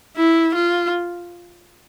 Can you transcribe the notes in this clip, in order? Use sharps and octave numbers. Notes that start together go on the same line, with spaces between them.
E4
F4